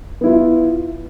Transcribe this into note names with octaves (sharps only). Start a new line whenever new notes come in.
B3 E4 F4